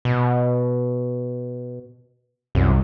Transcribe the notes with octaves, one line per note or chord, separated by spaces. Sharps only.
B2
C2 F#2